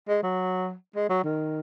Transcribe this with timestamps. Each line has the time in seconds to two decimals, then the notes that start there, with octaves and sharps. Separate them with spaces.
0.08 G#3
0.23 F#3
0.96 G#3
1.09 F#3
1.24 D#3